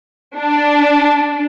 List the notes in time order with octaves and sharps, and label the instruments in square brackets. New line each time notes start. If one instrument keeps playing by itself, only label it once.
[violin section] D4